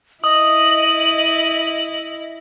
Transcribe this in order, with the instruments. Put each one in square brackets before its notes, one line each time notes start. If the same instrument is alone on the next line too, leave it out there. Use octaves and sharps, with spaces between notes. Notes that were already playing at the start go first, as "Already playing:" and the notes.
[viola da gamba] E4 [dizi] D#5 [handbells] D#6 [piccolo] F#7